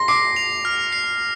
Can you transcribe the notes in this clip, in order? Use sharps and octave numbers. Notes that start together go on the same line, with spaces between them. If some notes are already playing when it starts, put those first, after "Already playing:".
Already playing: C6 A#6
D6 C7
F7
F6
C7